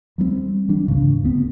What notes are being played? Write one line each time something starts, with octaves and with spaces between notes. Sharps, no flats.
F#3 G3 B3 C4
E3 D4
D2 G#2 C#3
D2 B3 C4